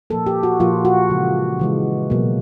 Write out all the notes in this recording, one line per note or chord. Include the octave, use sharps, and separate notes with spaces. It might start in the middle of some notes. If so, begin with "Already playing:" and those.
A#2 F3 A#3 A4
G4
F#4
A#2 F3 A#3 F4
F#4
C#3 E3 G#3
C#3 E3 G#3
B2 F#3 A#3